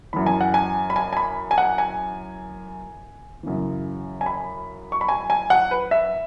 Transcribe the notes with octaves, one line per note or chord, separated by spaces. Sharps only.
F#2 E3 B5
G#5
F#5
G#5
B5
G#5
G#5
B5
G#5
F#5
G#5
F#2 C#3 E3
G#5
B5
C#6
B5
G#5
G#5
F#5
B4
E5